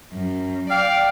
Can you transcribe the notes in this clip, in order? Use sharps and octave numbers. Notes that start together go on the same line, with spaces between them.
F#2
D5 F5 G5